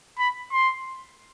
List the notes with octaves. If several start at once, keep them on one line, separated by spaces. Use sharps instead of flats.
B5
C6